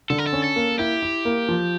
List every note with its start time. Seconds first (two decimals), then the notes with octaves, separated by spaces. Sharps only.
0.10 D3 A4
0.18 A#4
0.27 A4
0.33 C#4
0.44 A4
0.56 A#3
0.79 E4 G4
1.02 E4
1.25 A#3
1.48 F3